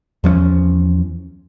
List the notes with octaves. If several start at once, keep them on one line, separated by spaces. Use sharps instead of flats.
E2 F3 A#3 C#4